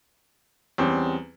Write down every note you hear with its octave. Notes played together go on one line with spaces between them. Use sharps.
E2 G3 C4 C#4